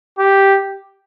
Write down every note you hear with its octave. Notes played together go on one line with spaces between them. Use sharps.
G4